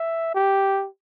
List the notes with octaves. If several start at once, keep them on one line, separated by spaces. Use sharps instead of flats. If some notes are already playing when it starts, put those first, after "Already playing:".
Already playing: E5
G4